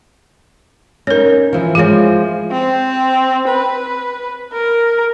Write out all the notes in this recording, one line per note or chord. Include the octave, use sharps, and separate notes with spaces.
C#4 D#4 A#4 C#5
E3 F3
F3 G#3 E4 F4 C#5
C4
B4
A#4